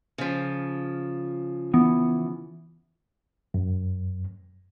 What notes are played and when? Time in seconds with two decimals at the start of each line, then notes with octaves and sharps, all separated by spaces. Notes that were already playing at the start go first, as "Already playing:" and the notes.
0.18 C#3 F3
1.74 E3 B3
3.54 F#2